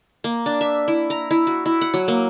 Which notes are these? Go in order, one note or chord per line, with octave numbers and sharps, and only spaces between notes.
A#3
D4
E5
E4
A#5
E4
F#4
E4
F#5
F#3
A#3